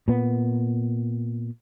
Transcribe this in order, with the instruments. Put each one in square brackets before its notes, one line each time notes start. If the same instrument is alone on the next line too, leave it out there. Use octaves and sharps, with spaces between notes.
[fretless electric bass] A#2 B3